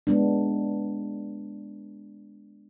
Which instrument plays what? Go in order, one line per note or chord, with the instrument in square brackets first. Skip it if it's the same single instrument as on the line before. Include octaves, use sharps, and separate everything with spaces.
[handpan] G#3 B3 D4